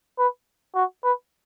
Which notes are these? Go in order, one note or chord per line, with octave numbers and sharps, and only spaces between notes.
B4
F#4
B4